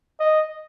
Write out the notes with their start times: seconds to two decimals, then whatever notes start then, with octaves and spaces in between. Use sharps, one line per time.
0.20 D#5